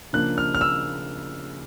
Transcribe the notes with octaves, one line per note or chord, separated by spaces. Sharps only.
C#3 F3 A#3 D4 F#6
F6
F6
E6